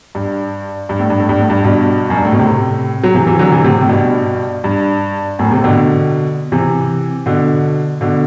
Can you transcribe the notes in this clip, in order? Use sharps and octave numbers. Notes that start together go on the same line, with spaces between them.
G2
G2
A2
G2
A2
G2
A2
G2
G2 B2
F#2
G2
A2
B2
A2 C3
F#3
C3 E3
C3 E3
D3 F#3
C3 E3
A2 C3
A2
G2 B2
G2
F#2 A2
A2 C3
B2 D3
C3 E3
B2 D3
B2 D3